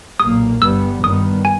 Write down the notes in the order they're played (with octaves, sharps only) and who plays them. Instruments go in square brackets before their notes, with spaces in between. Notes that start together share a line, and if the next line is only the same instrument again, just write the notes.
[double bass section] B1 A#2 A#3 [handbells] D#6
[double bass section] G1 G2 G3 B3 [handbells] E6
[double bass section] G2 D#3 G3 B3 [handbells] D#6
[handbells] G#5